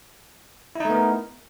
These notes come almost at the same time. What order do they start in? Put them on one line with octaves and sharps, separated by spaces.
E4 D#4 A3 B3 A#4